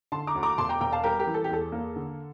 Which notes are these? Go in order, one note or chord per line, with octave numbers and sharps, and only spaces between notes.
D3 A5 C6
A#5 D6
D2
A#5 D6
E1 A5 C6
G5 A#5
E1 G5 A#5
F5 A5
G3 G4 A#4
G4 A#4
E3
A4
G4
E2 A4
A#3
D3